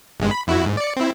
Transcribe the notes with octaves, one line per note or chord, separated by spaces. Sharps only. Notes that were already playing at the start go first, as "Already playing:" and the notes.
G1 G2 G#3
B5
F2 E4 F#4
G#2
D5 C#7
C4 E4